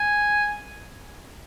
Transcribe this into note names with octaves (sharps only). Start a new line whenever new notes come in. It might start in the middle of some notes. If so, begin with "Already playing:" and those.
Already playing: G#5